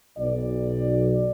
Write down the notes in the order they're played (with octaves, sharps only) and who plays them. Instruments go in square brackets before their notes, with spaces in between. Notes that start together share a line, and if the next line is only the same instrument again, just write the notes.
[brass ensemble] B1 D5